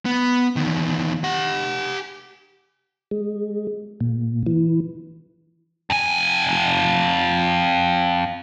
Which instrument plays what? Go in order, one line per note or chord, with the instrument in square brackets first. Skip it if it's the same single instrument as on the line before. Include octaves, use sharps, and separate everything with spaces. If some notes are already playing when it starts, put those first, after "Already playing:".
[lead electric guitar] B3
E2 D#3
G4 F#5
[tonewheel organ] G#3
A#2
E3
[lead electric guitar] F2 G#5